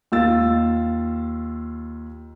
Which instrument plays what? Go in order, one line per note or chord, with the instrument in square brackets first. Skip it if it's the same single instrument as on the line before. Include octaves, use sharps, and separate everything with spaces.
[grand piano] D#2 F4 E6 A6